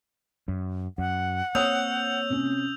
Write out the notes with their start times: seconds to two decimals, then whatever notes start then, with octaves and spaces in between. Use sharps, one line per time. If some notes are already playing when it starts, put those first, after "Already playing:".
0.48 F#2
0.98 F#2 F#5
1.55 A#3 C4 C#5 D#6 E6 G6 F7
2.30 C3 C#4